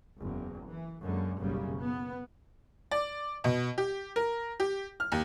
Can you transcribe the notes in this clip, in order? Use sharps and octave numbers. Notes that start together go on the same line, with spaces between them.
F#1 E2
E3
F#2 D3 G#3 A#3
F#1 B1 F#2 C#3 G3
B3
D5
B2
G4
A#4
G4
F6
D#2